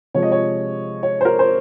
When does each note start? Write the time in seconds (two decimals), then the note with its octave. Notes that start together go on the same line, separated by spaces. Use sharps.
0.14 C3 F3 G#3 C#5
0.22 D#5
0.32 C#5
1.03 C#5
1.21 C5
1.25 A#4
1.39 C5